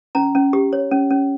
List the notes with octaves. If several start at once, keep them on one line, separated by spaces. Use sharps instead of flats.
C#4 A#5
C#4
G4
C#5
C#4
C#4